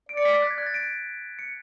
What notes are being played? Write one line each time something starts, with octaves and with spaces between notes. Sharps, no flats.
D5 D7
C#7
B6
A6
F#6
G#6
F#6
A6
D7
C#7